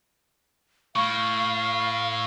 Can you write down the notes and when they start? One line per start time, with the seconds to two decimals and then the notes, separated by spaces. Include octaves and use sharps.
0.96 A2 F5 C#6